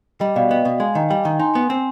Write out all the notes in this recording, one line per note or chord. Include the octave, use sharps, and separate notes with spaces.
G3 D#5 G5
B2 D5 F5
B3 D#5 G5
B2 D5
G#3 F5 G#5
D#3 D#5 G5
G3 D#5 G5
D#3
D#4 G#5 C6
B3
C4